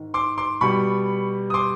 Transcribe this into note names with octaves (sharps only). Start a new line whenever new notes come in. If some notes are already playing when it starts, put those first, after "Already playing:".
Already playing: G#2 D#3
C6 D6
C6 D6
B2 G3 B5 C#6
D#6
C6 D6